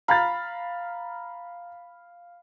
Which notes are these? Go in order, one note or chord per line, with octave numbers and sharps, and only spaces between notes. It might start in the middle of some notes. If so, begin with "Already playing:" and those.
F5 A#5 B5 F6 A6